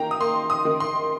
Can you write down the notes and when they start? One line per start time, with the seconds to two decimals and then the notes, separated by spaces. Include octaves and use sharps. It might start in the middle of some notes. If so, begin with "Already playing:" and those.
Already playing: D#3 A#3 G5 A#5
0.11 D#6
0.20 A#3 C6
0.50 D#6
0.65 D#3
0.80 C6